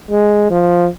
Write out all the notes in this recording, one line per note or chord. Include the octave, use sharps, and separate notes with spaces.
G#3
F3